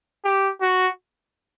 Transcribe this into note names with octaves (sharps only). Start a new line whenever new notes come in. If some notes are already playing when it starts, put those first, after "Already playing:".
G4
F#4